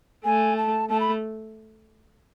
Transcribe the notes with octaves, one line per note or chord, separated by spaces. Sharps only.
A3 G#5
A5
A3 A5
B5